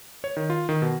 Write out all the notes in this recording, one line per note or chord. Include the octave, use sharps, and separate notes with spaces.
C#5
D#3
F4
D#3
B2